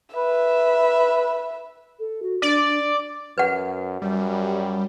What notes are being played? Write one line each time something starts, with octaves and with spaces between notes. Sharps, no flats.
B4 E5
A4
F#4
D4 D5
F#2 B4 F#5
F#2 G3